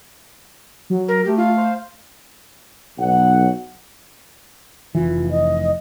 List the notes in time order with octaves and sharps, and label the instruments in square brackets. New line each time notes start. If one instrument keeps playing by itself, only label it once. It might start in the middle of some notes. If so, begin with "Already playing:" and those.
[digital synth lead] F#3
[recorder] A#4
[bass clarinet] A3 [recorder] G4
[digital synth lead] F4 [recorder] F5
[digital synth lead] C5
[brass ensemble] B1 F#3 F#5
[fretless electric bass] F1 E3 [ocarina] F4
[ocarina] D#5